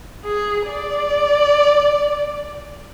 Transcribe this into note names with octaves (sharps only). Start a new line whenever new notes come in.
G#4
D5